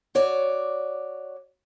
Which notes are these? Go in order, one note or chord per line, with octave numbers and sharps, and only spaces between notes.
F#4 C#5 D5